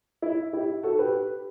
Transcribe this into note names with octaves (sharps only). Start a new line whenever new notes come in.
E4
E4 G4
F#4 A4
G4 B4